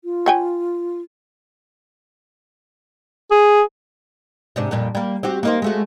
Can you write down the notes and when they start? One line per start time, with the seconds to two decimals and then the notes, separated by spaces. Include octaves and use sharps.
0.05 F4
0.26 C#5 G5 G#5
3.31 G#4
4.56 G#2 C3 D4
4.71 F2 A#2 G3
4.95 G3 A#3
5.23 C4 F#4 G4
5.43 A#3 D#4 C5
5.62 G#3 A3 F#4